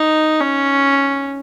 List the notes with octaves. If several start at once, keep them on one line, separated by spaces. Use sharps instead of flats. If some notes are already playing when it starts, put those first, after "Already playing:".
Already playing: D#4
C#4